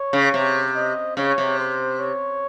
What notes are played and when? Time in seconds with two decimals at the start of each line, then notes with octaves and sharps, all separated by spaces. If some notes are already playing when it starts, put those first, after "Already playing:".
Already playing: C#5
0.13 C#3
0.34 C3
0.75 D#5
1.17 C#3 C#5
1.38 C3
1.59 C5
2.00 C#5